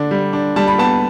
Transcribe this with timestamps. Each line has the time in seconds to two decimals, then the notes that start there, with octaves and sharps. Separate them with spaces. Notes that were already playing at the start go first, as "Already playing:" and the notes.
Already playing: D3 D4
0.11 G3
0.33 D4
0.56 G3 A5
0.67 B5
0.78 B3 A5